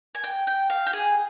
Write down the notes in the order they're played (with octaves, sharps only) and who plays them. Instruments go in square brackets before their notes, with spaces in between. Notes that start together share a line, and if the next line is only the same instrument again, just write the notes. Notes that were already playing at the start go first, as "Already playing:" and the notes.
[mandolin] G#5
G5
G5
F5
G4
G#4